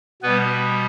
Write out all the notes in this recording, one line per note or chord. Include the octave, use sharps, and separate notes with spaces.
B2 G3 B3 B4